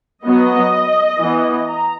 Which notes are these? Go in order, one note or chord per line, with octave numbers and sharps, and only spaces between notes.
F#3 B3 D#5
E3 B3
A#5